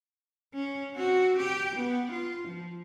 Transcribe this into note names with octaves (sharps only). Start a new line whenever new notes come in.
C#4
C4 F#4
G4 G5
B3
F4
F3